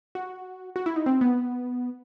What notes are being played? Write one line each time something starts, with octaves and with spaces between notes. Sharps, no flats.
F#4
F#4
E4
D#4
C4
B3